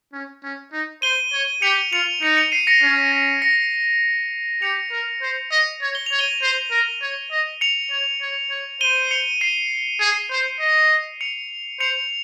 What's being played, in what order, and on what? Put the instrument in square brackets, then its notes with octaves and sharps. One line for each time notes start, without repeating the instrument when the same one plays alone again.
[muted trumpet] C#4
C#4
D#4
[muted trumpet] C5 [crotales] D#7 G7
[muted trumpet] C#5
[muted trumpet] G4 [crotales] C#7 F7
[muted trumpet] F4 [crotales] C#7 F7
[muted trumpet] D#4 [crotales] C#7 F7
[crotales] C#7 F7
C7 D#7
A#6 C#7
[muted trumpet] C#4
[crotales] A#6
A#6 C#7
[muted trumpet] G4 [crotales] C#7 F7
[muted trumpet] A#4
C5
D#5
C#5
[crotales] G7
F7
[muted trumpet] C#5
[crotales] D#7 G7
[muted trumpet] C5
A#4
C#5
D#5
[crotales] C#7 F7
[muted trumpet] C#5
C#5
C#5
[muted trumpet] C5 [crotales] D#7 G7
[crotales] C#7 F7
C7 D#7
[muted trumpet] G#4
C5
D#5
[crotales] C#7 F7
[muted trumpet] C5 [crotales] C#7 F7